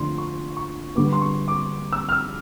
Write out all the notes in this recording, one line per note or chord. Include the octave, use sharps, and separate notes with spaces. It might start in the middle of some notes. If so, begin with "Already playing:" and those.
Already playing: D3 F3 A3 D4 C6
C#6
C#6
D3 G3 B3 D6
C6
C#6
D6
E6
F6
E6